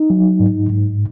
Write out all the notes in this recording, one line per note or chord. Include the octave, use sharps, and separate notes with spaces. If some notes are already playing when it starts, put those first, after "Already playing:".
Already playing: D#4
F#3
G#2
G#2